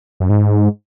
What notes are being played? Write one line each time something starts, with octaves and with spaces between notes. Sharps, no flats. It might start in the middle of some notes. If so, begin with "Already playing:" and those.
F#2
G#2